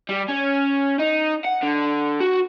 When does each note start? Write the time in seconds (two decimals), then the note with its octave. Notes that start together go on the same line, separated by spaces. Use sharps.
0.09 G3
0.28 C#4
0.99 D#4
1.45 F#5
1.63 D3
2.20 F#4